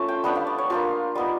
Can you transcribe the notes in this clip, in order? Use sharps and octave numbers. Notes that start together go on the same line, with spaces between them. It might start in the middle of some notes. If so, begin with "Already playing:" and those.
Already playing: A3 C#4 F4 A5
G5
G3 B3 D4 F#5
F5
D5
C#5
A#3 D4 F4 G4
G3 B3 D#4